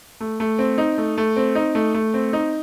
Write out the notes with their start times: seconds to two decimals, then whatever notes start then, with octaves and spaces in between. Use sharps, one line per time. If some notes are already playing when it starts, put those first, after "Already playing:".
0.20 A3
0.40 A3
0.59 C4
0.78 D#4
0.98 A3
1.18 A3
1.36 C4
1.55 D#4
1.75 A3
1.94 A3
2.14 C4
2.33 D#4